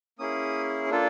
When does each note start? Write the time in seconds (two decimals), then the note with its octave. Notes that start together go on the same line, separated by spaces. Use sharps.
0.19 A#3 C#4 E4 G#4 D#6
0.90 A#3 D4 F4 A4